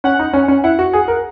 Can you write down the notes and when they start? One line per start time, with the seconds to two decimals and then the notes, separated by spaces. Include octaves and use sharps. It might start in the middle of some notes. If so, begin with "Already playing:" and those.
0.04 C#4 F#5
0.19 D#4
0.33 C#4
0.48 C#4
0.64 E4 F#5
0.79 F#4
0.93 G#4
1.08 A#4